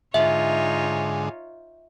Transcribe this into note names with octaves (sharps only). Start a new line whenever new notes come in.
G#2 D3 D#4 F4 G#4 C#5 E5